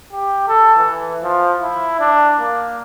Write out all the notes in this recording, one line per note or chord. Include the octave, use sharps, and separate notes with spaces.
G4
A4
E3
F3
E4
D4
A#3